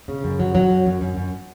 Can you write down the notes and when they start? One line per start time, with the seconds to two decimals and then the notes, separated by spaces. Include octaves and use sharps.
0.08 C#3
0.24 F#2
0.39 F#3
0.55 F#3
0.70 F#2
0.86 F#2
1.01 F#2
1.17 F#2